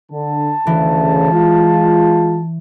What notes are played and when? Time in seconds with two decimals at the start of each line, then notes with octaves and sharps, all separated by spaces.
0.12 D3 A5
0.67 D2 C#3 E3
1.33 G#3 F4